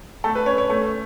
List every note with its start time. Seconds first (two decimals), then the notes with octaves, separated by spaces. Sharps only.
0.24 A3 A4
0.35 B4
0.46 C#4 C#5
0.58 C#5
0.70 A3